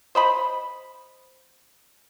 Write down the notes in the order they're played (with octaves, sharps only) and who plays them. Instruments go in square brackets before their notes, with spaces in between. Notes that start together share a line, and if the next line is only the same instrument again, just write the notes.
[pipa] C5 D#5 B5